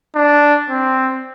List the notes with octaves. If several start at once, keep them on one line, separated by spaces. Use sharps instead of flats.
D4
C4